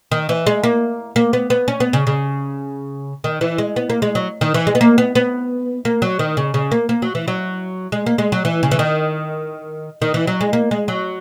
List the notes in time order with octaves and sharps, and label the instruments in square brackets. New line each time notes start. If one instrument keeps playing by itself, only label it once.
[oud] D#3
E3
G#3
A#3
A#3
B3
B3
C#4
B3
C#3
C#3
D#3
E3
G#3
B3
A#3
G#3
F#3
D#3
E3
G#3
B3
A#3
B3
B3
A#3
F#3
D#3
C#3
C#3
A#3
A#3
F#3
E3
F#3
G#3
A#3
G#3
F#3
E3
C#3
E3
D#3
D#3
E3
F#3
G#3
A#3
G#3
F#3